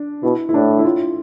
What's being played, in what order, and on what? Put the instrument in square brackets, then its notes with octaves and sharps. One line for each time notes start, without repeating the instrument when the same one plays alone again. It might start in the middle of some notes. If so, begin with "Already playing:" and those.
Already playing: [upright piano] D4
[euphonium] B2 [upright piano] E4
[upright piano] E4
[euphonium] A2 [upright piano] D4
[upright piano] E4
F4